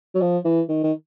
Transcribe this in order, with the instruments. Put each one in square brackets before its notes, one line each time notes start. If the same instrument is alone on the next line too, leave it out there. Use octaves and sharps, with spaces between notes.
[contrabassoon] F#3
F3
E3
D#3
D#3